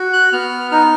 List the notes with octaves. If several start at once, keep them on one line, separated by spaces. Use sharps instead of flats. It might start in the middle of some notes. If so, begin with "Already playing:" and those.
Already playing: F#4
F#6
B3 F6
D#4 F6